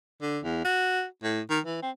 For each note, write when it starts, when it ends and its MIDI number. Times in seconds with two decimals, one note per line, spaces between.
0.21 0.39 50
0.44 0.64 40
0.64 1.05 66
1.23 1.41 45
1.49 1.60 51
1.65 1.78 52
1.82 1.91 60